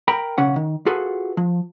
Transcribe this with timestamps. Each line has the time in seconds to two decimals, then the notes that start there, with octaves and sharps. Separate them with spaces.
0.08 A#4 G5 A#5 B5
0.38 B1 C#3 C#4 F#5
0.56 D#3
0.86 F4 F#4 G#4 A4 B4
1.37 F3